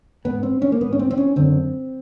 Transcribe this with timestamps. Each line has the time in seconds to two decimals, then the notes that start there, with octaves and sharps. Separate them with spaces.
0.25 G#2 B3
0.43 C4
0.62 C#4
0.72 A#3
0.81 G#2 B3
0.93 C#4
0.99 C4
1.11 C4
1.17 C#4
1.36 F#2 D3 C4